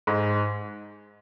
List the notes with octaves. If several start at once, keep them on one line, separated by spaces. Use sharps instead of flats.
G#2 G#3